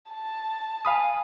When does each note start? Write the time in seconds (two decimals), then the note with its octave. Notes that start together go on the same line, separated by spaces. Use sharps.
0.11 A5
0.85 F5 G#5 B5 D#6